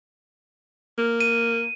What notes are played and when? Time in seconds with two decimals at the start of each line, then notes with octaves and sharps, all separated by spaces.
0.98 A#3
1.21 D#7